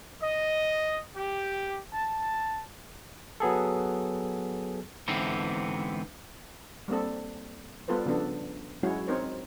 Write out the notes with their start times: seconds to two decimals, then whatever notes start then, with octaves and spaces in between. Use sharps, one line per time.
0.22 D#5
1.16 G4
1.93 A5
3.40 F#3 B3 G#4 A4
5.08 G#2 D3 E3 B3 C4
6.88 G3 A#3 C4 A4
7.88 G3 B3 F4 A4 B4 C5
8.06 C#3 F3 B3 D4 A4
8.83 F#3 G#3 C#4 E4 F#4 C#5
9.08 C4 D#4 A#4 C5 C#5